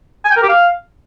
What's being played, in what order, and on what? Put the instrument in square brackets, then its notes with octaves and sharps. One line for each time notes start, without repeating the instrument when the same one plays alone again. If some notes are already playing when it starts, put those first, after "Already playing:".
[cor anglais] G#5
G5
A#4
G4
F5